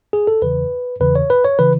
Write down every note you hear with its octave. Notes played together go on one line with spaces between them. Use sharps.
G#4
A4
E2 C#3 E3 B4
E2 C#3 E3 B4
C#5
B4
C#5
C#3 E3 B4